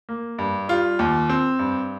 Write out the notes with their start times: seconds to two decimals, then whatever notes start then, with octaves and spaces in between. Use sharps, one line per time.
0.09 A#3
0.39 G2
0.68 G3 F4
0.99 D#2
1.29 C4
1.59 G2